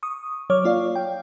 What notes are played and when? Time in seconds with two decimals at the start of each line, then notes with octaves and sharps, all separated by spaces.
0.03 C#6 D#6
0.50 F#3 C#5 D6 F6
0.64 A#3 F4 D5 F5
0.95 G5